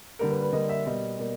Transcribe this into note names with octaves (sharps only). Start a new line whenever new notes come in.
D3 G3 A#3 A#4
B4
B4
D3 G3 A#3 D#5
E5
B2 G3 A#3 D#5
B2 G3 A#3